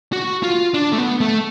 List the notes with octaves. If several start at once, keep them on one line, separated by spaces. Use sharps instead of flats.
F#4
F4
D4
A3
B3
A3